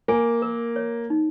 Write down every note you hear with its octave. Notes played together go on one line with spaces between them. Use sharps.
A#3 G#5
A#4
C#5
D#4